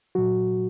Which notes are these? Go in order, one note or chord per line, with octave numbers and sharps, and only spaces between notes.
A#2 F#3 F#4